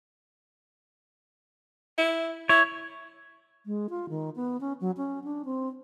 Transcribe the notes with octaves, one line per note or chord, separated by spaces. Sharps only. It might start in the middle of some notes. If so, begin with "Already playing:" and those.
E4
E4 C#5
G#3
F4
D#3
B3
C#4
F#3
C#4
D4
C4